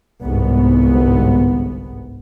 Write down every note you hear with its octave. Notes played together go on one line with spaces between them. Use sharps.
G1 C2 G#2 B3